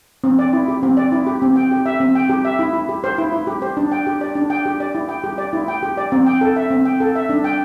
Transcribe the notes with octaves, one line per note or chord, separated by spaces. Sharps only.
C4
D5
E4
G4
C4
D5
E4
G4
C4
G5
G4
E5
C4
G5
G4
E5
E4
E4
G4
C5
E4
E4
G4
C5
D4
G5
G4
D5
D4
G5
G4
D5
E4
G5
G4
D5
E4
G5
G4
D5
C4
G5
A4
E5
C4
G5
A4
E5
D4
G5